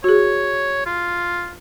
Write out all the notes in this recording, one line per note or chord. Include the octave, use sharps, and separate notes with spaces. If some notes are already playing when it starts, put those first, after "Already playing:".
F#4 G#4 C#5
F4